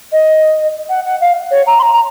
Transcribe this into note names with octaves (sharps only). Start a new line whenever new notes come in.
D#5
F#5
F#5
F5
C#5
A#5
C6
A#5
A#5